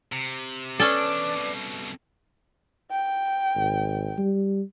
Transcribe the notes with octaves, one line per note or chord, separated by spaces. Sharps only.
C3
E2 C#4 D4 A4 B4 D5 D6
C2 B2
G5
G#1
G3